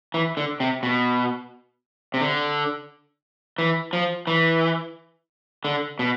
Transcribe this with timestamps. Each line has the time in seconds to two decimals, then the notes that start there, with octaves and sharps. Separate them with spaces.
0.14 E3
0.37 D3
0.60 C3
0.83 B2
2.14 C3
2.21 D3
3.58 E3
3.93 F3
4.27 E3
5.65 D3
5.99 B2